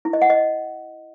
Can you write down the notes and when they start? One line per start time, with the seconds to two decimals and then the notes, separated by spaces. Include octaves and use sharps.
0.05 E4
0.13 D#5
0.22 F#5
0.30 D#5